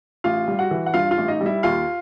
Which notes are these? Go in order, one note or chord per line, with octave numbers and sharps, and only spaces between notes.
A1 F4 F5
G3
F#4 F#5
E3
F#5
G2 F4 F5
F4 F5
A1
D#4 D#5
G3
E4 E5
D#2 F4 F5